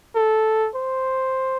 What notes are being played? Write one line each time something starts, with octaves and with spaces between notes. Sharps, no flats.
A4
C5